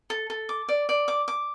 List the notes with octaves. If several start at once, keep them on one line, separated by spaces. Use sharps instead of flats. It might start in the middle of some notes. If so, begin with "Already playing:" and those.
A4
A4
D6
D5
D5
D6
D6